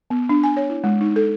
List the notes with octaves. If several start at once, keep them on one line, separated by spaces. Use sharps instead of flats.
B3
D4
G#5
C#5
E4
G#3
D#4
A4